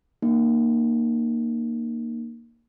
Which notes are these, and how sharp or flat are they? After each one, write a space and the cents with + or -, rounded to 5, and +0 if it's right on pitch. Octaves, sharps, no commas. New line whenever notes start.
A#3 +0 D#4 -40